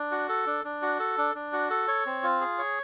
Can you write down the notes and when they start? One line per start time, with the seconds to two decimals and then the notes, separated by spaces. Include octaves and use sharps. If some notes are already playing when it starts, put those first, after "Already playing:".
Already playing: D4
0.11 F#4
0.29 A4
0.47 D4
0.65 D4
0.82 F#4
1.00 A4
1.18 D4
1.35 D4
1.53 F#4
1.70 A4
1.88 C#5
2.06 C4
2.23 F4
2.40 G#4
2.58 C#5